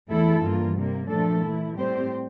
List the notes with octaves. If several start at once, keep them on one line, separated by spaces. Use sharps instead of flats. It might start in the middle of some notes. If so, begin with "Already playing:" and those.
E2 E3 A3 E4 A4
G2 E3 A#3 F4
C3 G3 A#3
A#2 F3 A3 D4 A4
E3 A3 E4
A2 G3 C4 G4 C5